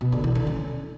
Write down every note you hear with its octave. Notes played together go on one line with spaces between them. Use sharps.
B2
D3
E3
D3
C#4